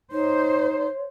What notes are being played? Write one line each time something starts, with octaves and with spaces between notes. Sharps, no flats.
D#4 C5 C#5